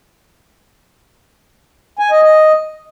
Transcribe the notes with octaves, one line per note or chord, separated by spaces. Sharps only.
G#5
D#5
D#5